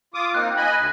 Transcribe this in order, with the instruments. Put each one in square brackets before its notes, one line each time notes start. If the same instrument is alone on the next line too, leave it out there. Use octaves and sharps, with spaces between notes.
[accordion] F4 D6 D#6
[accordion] A#3 C4 D#4 [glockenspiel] F#6
[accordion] D#5 G#5 B5
D2